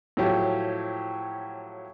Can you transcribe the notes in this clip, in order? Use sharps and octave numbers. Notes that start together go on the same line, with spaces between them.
A2 F3 F#3 G4